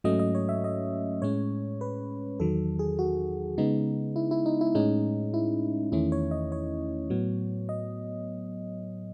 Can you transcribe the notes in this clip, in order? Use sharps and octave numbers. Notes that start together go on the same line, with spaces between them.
G#2 F#3 A3 C#4 D#5
D#5
C#5
E5
D#5
A2 G#3 C#4 C#5
B4
E2 D#3 F#3 A4
G#4
F#4
C#3 G#3 B3 D#4
E4
E4
D#4
E4
A2 G#3 C#4 D#4
E4
E2 D#3 A3 C#4 E4
C#5
D#5
C#5
A2 F#3 B3
D#5